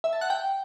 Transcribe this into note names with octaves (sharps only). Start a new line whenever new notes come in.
E5
A5
F#5
G5